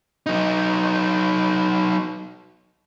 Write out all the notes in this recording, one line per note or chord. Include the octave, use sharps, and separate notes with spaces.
F#3 D#4